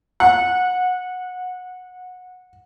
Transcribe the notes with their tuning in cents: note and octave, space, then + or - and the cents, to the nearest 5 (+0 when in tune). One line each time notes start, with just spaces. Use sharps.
F#5 -20